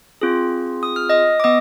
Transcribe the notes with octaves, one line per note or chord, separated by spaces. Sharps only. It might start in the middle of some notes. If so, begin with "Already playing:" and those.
C4 F4 G#4
D#6
F6
D#5 D#6
D6
B3 D#5 D#6